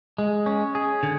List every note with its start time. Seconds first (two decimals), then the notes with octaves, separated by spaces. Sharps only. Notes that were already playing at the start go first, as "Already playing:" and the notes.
0.18 G#3
0.46 C#4
0.75 G#4
1.03 D3